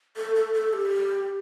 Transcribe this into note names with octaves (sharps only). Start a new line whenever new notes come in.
A4
A4
A4
G4